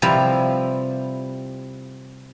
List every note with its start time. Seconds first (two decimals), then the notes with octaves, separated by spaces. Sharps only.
0.02 C3 F3 G3 E4 B4 A#5